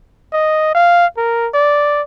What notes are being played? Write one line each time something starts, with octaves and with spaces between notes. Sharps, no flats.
D#5
F5
A#4
D5